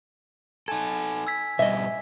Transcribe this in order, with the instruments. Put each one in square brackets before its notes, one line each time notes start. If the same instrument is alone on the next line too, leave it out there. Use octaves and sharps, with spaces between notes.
[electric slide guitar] D#4 A4 [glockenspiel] G#5 G#6
[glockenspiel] E6 G#6 B6
[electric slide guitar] B2 G3 [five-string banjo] D#5 E5